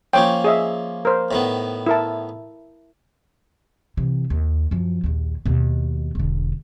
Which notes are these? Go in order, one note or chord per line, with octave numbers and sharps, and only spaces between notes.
F3 A#3 C#4 C#5 G5
G#4 D#5 E5
A#4 C5
A2 D#3 B3
E4 A#4 A5
C3 E3
D#2
F#2 F3
A#1 D#2
D#2 B2
E1 D3